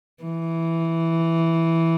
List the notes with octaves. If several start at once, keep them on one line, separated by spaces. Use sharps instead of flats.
E3